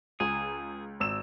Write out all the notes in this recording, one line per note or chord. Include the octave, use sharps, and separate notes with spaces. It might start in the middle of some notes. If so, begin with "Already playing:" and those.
C#2 G#4
G#1 E6 E7